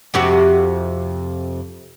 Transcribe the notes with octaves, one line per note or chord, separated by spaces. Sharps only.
F2 C3 F#4